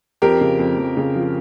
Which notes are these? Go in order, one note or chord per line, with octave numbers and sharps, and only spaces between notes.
F2 G4 A#4
C#3
F2
F2
C#3
F3